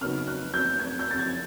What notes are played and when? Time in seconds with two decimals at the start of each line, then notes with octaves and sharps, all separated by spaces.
0.01 C#3 F#3 B3 D#4 F6
0.27 F#6
0.54 G6
0.80 G#6
0.99 G6
1.11 A6
1.19 G#6